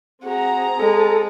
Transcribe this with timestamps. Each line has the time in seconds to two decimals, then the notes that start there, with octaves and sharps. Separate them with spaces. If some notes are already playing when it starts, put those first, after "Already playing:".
0.24 C4 F#4 G#4 A#5
0.79 G#3 A4